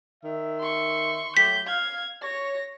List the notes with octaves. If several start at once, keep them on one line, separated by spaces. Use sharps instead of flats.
D#3 E5
C6 C#6
F#3 A3 G4 G6 B6
F5 G#6
C#5 A#6